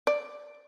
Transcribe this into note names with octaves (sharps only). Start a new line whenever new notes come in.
D5